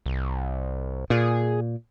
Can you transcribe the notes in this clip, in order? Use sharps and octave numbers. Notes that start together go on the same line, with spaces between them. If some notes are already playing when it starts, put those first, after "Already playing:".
C2
A#2 G#4